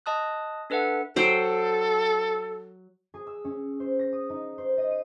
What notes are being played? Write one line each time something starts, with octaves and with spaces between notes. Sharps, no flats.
D#5 A5 D#6 F#6
D4 A4 B4 E5 F#5
F#3 A4 C5 G5
G#4
E6
C#4
C5
A#6
D#6
D#4
C5
D#5
D#7